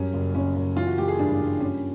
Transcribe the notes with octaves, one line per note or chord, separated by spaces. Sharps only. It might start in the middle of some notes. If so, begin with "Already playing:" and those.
Already playing: F#2 G3 C#4
F#1
F#1 C#4
F#1
E3 F4
F#4
E3 G4
G#4
G2 D4
G2
G3 C#4